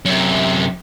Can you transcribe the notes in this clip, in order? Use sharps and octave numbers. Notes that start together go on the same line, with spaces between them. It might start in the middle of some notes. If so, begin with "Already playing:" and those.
F#2 C3